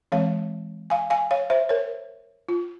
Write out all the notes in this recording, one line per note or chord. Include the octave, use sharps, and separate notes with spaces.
E3 G#3 C4 C#5 F5
F5 G#5
F5 G#5
C#5 F5
C5 E5
A#4 C#5
F4